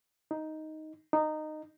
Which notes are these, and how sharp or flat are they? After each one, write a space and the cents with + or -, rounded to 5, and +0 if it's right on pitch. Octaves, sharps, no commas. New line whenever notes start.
D#4 +5
D#4 -15